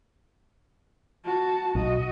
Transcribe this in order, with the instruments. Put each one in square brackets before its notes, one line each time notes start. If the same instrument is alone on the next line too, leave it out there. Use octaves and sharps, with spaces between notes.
[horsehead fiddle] F#4 A5
[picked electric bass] B1 [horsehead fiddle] F#4 D#5